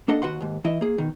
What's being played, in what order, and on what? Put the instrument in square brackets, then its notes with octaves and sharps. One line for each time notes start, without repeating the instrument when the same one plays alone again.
[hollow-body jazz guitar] A#3 D4 A4 D#5 F#5
D#2 F#4 B4 F#5 C6
D#2 G#2
E3 E4 D#5 E5
A#3 G#4
B2 D#3